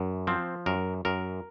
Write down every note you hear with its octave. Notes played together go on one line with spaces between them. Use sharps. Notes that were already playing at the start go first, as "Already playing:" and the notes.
Already playing: F#2
F3 C4
F#2 A#4
F#2 A#4